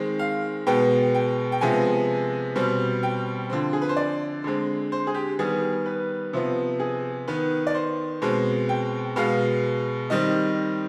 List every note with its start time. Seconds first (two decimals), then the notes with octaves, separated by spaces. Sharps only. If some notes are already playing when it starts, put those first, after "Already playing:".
Already playing: D#3 G#3 C4
0.19 F5
0.67 B2 G#3 B3 G5
1.15 G5
1.52 G5
1.61 C3 F3 G#3 B3 G#5
2.56 B2 G3 C4
3.03 G5
3.50 D3 F3 C4
3.73 G#4
3.82 B4
3.89 C5
3.97 D5
4.44 D3 G#3 C4
4.92 C5
5.07 G#4
5.14 G4
5.39 D#3 G3 B3 G#4
5.86 B4
6.33 C3 F3 B3
6.80 G#4
7.28 D#3 B3 B4
7.67 D5
7.75 C5
8.22 B2 G#3 C4
8.69 G5
9.16 B2 G#3 B3 F5
10.10 D#3 G3 C4 D#5